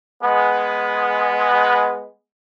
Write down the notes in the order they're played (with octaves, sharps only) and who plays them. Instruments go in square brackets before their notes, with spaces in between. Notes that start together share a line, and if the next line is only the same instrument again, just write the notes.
[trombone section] G#3 B3